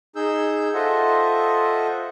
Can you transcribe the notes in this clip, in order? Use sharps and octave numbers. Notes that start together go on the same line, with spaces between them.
D#4 G#4 E6 G6
F4 A4 C5 D#5 E5 F#5